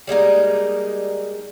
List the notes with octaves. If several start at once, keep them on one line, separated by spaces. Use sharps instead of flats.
G3 G#3 A#3 D#4